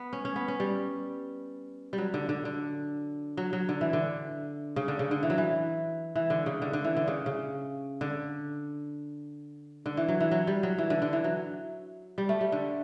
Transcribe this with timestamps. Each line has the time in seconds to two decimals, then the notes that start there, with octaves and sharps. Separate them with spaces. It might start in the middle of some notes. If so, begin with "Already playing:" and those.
Already playing: B3
0.13 C#4
0.25 C#4
0.36 B3
0.48 C#4
0.60 G3
1.93 G3
1.98 F#3
2.14 D3
2.29 D3
2.45 D3
3.37 F#3
3.53 F#3
3.69 D3
3.81 E3
3.93 D3
4.76 C#3
4.88 D3
4.99 C#3
5.11 D3
5.23 E3
5.30 F#3
5.38 E3
6.16 E3
6.30 D3
6.46 C#3
6.62 D3
6.73 D3
6.84 E3
6.97 D3
7.08 C#3
7.26 C#3
8.01 D3
9.86 D3
9.97 E3
10.08 F#3
10.20 E3
10.31 F#3
10.47 G3
10.63 F#3
10.78 E3
10.90 D3
11.02 D3
11.13 E3
11.24 F#3
12.18 G3
12.29 A3
12.41 G3
12.52 D3